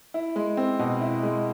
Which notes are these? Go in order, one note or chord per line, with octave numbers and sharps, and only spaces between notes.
E4
G#3
C4
B2
E4
G#3